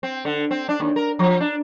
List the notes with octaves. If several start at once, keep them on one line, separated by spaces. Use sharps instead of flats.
C4
D3
C4
D4
D#2
A#4
F3
D4